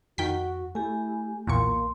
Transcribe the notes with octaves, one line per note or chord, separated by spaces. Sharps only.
F2 D#3 F#4 G5 B6
A3 E4 G4 G#5
B1 E2 A#2 A#3 C6 C#6